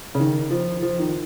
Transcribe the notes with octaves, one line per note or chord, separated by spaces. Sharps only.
C#3
D#3
F3
F3
D#3